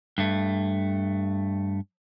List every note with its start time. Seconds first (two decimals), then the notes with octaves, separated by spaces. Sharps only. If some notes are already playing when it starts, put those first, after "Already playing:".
0.18 G2 A3